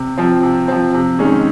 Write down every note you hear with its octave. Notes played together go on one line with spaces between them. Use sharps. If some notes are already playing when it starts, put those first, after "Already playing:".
Already playing: C3
F3 C4
C3
F3 C4
C3
D#3 G#3 C#4